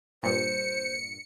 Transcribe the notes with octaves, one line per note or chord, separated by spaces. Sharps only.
G2 A#2 C5 C#7